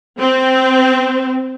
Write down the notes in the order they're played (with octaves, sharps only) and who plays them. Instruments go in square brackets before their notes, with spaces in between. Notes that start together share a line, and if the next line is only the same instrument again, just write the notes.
[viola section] C4